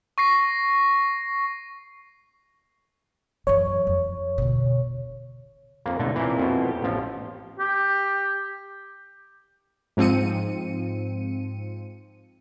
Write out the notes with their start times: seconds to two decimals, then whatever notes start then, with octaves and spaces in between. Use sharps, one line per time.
0.18 C#6 A#6 C7
3.47 F#2 E3 C#5
3.87 F2
4.38 B2 D3
5.86 F2 A#3
5.99 C#2 B2 D3 A3 D#4
6.15 A#2 E3 A#3 C4 E4
6.38 F2 B2
6.65 B3 G4
6.82 A1 F3
7.59 G4
9.97 G#2 F3 C4 C#7 D#7